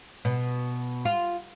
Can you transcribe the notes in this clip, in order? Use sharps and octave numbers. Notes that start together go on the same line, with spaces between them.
B2
F4